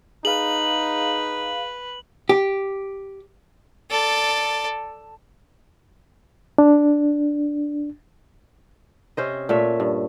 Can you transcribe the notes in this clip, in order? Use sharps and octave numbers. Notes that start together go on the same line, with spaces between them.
D#4 G#4 B4 F5 F#7
G4
A4 D5
D4
C3 C#4 C5 D#5
A#2 A3 C#5 E5
G2